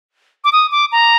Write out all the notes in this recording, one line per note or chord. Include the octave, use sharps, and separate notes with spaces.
D6
D#6
D6
A#5